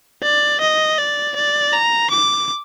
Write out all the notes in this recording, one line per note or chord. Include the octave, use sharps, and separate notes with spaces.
D5
D#5
D5
D5
A#5
D6